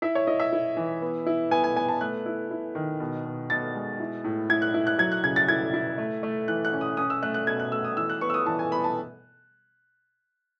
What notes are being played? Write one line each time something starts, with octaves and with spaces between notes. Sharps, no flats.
E4 E5
C#5
E4 D#5
E5
E4
E3
B3
E4
B3 G#5
G#5
B3 G#5
A5
A3 F#6
E4
E4
D#3
B2
B2
B2 A6
G#3
E4
A2
E4 G#6
F#6
E4
F#6
F#3 G#6
F#6
C#3 G#6
A6
E4 G#6
E4
A3
A3
E3 F#6
F#6
C#4
D#6
C#4 D#6
E6
A3 F#6
F#6
B2 G#6
F#6
A3 E6
D#6
E3 E6
F#6
B3 C#6
E6
D#6
E3 A5
G#5
B3 B5
A5